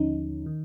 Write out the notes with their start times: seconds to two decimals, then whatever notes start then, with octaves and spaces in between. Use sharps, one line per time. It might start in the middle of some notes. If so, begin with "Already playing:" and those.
Already playing: D#2 D3 F3 C#4 D#4
0.46 D#3